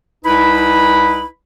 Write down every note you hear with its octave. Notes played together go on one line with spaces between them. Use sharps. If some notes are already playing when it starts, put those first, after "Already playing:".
C2 D#4 E4 B4 B5